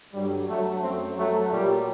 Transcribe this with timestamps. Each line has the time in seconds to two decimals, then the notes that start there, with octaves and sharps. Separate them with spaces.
0.13 G2 D3 F#3 G3
0.47 F#3 A3
0.82 F#2 F#3 A3 C4
1.17 F#3 A3
1.51 A#2 F#3 G3